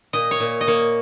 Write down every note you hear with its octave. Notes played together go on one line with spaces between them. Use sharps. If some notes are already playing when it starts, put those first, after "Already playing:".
A#2 D#5
C#5
A#2
D#5
A#3 C#5